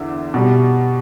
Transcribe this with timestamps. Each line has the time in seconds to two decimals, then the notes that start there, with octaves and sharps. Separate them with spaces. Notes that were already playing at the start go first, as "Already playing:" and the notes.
Already playing: E2 D3 E5
0.34 B2 G3